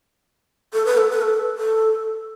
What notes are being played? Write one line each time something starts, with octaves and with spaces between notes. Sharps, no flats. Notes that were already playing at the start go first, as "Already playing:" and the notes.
A4
B4
A4
B4
A4
A4